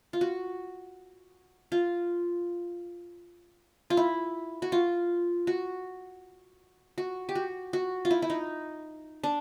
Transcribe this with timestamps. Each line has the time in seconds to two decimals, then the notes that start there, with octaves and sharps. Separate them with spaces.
0.13 F4
0.21 F#4
1.72 F4
3.90 F4
3.97 E4
4.62 F#4
4.72 F4
5.47 F#4
6.98 F#4
7.29 G4
7.35 F#4
7.73 F#4
8.05 F4
8.11 E4
8.22 E4
8.30 D#4
9.23 D4